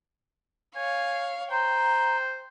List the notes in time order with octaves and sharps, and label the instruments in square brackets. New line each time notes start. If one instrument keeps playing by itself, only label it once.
[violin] C#5 F5 [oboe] G#5
[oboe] C5 [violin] G5 [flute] A#5